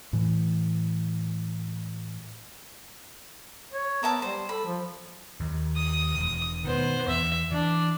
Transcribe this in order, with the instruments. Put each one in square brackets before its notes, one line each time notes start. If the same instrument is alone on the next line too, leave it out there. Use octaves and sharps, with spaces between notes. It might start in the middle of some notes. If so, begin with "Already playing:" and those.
[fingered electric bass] A2 E3
[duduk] C#5
[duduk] B3 [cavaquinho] A#4 E5 A5
[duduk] G3 [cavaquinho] C5
[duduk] A4 [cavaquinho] B5
[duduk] F3
[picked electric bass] D#2
[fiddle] D#6
[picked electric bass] E1
[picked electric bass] B2 D#3 [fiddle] B3 C5
[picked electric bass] E2 [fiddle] E5
[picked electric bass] E3 [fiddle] D4